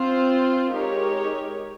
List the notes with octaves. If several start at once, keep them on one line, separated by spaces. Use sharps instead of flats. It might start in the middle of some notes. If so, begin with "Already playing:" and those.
Already playing: C4 F4 C5
G#3 D#4 G4 A#4 C#5